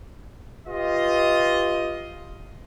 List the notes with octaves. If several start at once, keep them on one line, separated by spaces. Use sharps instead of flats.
F4 G4 B4 D#5